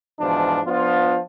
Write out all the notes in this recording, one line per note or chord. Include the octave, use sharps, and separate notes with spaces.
G#2 B2 E3 F3 D4
F3 B3 D4 F4